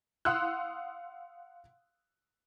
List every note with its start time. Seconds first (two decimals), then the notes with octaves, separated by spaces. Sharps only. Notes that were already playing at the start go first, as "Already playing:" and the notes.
0.25 F5 F#5 C6 D#6 E6 F#6